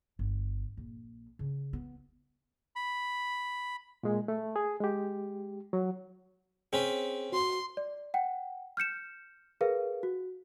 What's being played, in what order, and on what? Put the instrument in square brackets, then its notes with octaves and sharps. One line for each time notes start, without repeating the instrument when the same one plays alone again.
[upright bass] G1
A#1
C#3
B3
[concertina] B5
[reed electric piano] A#2 G#3
A3
G#4
G#3 G4
F#3
[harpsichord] C4 C#4 B4 [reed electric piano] G#4
[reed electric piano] F#4 [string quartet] C6
[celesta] D5
F#5 G5
F6 G6 C#7 E7
G#4 A#4 B4 F5
F#4